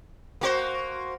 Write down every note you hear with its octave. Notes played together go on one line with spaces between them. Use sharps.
A#3 F#4 C5